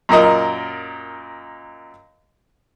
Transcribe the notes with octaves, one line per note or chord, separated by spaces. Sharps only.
F#2 A#2 A#4 D#5